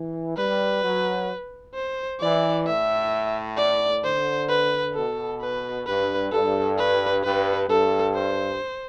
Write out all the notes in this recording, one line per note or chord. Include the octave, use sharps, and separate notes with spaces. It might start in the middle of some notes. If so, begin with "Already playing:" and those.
Already playing: E3
G3 B4
F#3
C5
E3 D5
A2 E5
D5
D3 C5
B4
B2 A4
B4
G2 B4
G2 A4
B4
G2 B4
G2 A4
C5